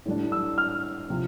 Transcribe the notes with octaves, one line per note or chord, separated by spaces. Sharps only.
A2 G3 D4
E6
F6
C3 F3 C4